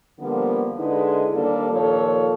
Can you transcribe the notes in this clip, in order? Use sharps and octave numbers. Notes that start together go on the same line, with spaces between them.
D3 F3 G3 A#3 B3
D3 G#3 D#4 E4 B4
D#2 G3 A#3 D4 A4
D#2 A#2 F3 A4 C#5